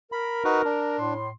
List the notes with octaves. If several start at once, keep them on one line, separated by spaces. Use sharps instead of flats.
A#4 B5
D#4 F#4 B4
D4
A2 C6